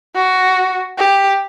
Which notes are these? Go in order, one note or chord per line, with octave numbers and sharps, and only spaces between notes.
F#4
G4